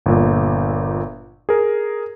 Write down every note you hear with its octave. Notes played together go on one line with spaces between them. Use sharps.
G1 A#2
G#4 A#4